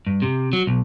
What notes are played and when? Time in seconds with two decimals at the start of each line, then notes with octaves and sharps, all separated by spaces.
0.07 G2
0.22 C3
0.53 F#3
0.67 B1